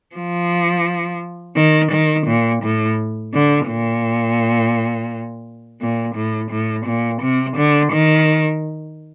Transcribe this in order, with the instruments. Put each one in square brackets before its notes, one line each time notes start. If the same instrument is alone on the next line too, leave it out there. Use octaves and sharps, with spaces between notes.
[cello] F3
D#3
D#3
A#2
A2
D3
A#2
A#2
A2
A2
A#2
C3
D3
D#3